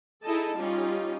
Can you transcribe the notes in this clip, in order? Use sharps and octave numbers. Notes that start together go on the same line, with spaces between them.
D#4 E4 G#4 A4 D#5 A5
G3 C#4 D#4 F4 G4